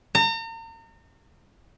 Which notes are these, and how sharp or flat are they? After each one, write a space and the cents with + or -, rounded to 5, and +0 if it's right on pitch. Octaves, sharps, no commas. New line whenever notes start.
A#5 -40